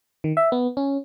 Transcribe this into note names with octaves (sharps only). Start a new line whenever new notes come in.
D#3
E5
B3
C#4